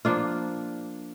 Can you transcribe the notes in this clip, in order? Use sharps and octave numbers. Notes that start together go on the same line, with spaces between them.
F3 A#3 D4 F4